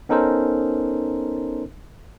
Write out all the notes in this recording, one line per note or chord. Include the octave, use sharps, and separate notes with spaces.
B3 C#4 D#4 A4 A#4 C5